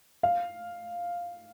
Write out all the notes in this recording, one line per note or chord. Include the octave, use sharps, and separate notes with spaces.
F5